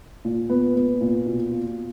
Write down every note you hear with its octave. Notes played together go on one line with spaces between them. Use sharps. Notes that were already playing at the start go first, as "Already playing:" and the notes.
A#2
B3
B3
A#2
B2
F4